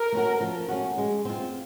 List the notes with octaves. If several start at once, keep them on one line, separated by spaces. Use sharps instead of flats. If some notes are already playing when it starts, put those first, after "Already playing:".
Already playing: A#4
A3 C#4 F#4
F3
A3 C#4 F#4
G#3
C4 F4